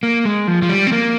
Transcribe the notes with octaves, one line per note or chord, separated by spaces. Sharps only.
A#3
G#3
F3
F3
G3
C4
A#3